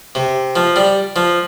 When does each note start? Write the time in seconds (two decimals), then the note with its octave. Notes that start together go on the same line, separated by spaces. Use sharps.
0.15 C3
0.56 F3
0.76 G3
1.16 F3